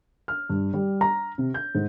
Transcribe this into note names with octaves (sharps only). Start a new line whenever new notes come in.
F6
G2
G3
A#5
C3
G6
G#2